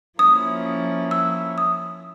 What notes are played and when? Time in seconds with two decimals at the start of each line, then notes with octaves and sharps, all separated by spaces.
0.19 F3 A#3 C#4 E4 D#6
1.11 E6
1.58 D#6